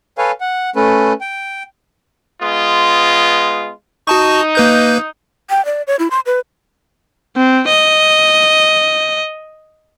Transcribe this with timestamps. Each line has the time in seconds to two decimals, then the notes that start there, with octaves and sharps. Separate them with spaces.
0.18 A4 B4 C#5 F5 G#5
0.41 F#5
0.76 A3 C#4 A4 B4
1.21 G5
2.41 G#3 B3 F4
4.07 D#4 F#4 A5 C#6
4.55 A#3 B4 G6
5.50 G5
5.65 D5
5.87 C#5
5.99 E4
6.11 C6
6.26 B4
7.37 C4
7.68 D#5